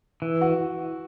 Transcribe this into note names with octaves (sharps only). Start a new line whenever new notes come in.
E3
F#4